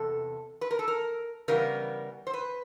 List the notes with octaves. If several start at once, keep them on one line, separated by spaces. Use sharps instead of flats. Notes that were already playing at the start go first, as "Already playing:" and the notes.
Already playing: E2 C3 A4
B4
A#4
A4
A#4
C#3 E3 G3 B3 A#4
C5
B4